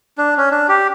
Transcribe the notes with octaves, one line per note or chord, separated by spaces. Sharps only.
D4
C#4
D4
G4